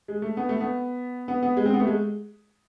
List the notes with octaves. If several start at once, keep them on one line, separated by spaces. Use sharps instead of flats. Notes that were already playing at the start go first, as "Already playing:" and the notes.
G#3
A3
B3
A3
B3
B3
B3
G#3
C4
B3
A3
G#3